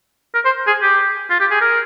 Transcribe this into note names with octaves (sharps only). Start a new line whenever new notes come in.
A#4
C5
G#4
G4
F4
G4
G#4
A#4